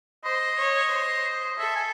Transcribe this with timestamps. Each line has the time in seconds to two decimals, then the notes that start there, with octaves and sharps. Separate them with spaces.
0.25 C5 D#5
0.59 C#5
0.92 C5
1.59 A4 E5
1.75 G#5